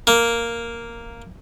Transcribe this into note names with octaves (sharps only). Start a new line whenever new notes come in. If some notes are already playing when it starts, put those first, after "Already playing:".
A#3